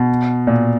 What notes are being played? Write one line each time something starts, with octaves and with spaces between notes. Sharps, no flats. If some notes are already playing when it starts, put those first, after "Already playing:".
Already playing: B2
A#2